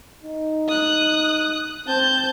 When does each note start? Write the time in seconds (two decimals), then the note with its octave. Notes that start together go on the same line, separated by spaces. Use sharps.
0.23 D#4
0.69 D#6 F#6
1.88 C4 A5 G6